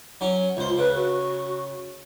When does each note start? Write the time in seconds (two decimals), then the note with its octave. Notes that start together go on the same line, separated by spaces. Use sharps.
0.21 F#3 C#4
0.57 C#2 F4 C5
0.78 C#3 B4
0.95 F#4